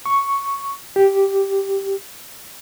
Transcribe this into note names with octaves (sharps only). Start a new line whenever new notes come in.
C#6
G4